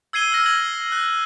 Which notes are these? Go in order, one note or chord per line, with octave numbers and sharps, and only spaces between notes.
E6 G#6 C7 D#7 G7
E6 F6 A#6
G#6 F#7
F6 F#6